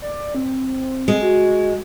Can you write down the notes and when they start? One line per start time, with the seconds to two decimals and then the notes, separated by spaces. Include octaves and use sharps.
0.02 D5
0.35 C4
1.08 G#3
1.22 F#4